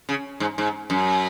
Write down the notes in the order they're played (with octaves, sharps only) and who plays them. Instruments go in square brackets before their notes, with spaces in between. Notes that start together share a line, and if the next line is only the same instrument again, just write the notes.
[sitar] C#3
G#2
G#2
F#2